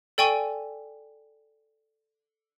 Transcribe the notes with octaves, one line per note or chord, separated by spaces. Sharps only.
A4 D5 G5 G#5 C#6 D#7